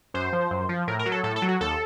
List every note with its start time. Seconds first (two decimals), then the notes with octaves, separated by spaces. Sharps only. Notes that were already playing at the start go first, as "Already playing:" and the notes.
0.14 F#2 C5
0.33 F3
0.51 F#2
0.69 F3
0.87 A2 A#4
0.99 A#4
1.06 F#3
1.12 A4
1.23 A2 A4
1.36 A4
1.42 F#3
1.48 F#4
1.60 D#2 A4